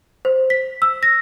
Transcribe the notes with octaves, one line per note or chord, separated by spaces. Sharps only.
C5
B6
E6
A#6